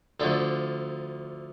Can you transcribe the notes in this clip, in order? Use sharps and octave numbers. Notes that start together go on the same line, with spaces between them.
D2 D3 F3 A3 E5